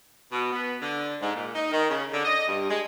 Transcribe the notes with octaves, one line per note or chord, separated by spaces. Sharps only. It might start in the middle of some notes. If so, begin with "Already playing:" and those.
B2
B3
D3
G#2
A#2
D#4
D#3
C#3
D3
D#5
G2
G#3